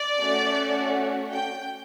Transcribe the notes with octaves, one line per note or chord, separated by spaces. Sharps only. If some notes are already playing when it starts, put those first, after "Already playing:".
Already playing: D5
A3 C#4 F#4
G5